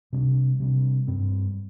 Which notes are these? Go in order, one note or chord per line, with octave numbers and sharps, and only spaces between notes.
C3 G3 D4
C3 G3 D4
G2 G3 C4